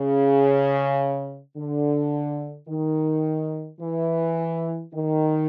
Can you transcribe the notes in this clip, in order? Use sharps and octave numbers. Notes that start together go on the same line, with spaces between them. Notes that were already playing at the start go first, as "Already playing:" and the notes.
Already playing: C#3
D3
D#3
E3
D#3